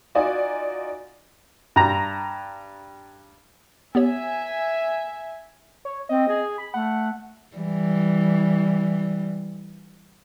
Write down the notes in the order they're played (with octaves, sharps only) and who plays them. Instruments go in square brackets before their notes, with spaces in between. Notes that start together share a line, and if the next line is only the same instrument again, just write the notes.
[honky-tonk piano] D#4 F4 F#4 D5 D#5 G#5
[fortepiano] G2 A#5
[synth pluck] B3 G4 C#5 [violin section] E5 G#5
[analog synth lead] C#5
[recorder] C4 [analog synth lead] D#5
[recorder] G#4
[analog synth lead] B5
[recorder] A3 [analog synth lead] F#5
[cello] E3 G3